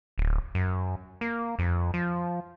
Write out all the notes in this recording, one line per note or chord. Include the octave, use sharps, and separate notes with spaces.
D1
F#2
A#3
F2
F3